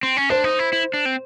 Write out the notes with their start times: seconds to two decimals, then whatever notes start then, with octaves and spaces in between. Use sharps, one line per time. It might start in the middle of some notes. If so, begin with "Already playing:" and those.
0.03 C4
0.17 C#4
0.29 D4 C5
0.44 D#4
0.59 E4
0.73 E4
0.94 D4
1.05 C4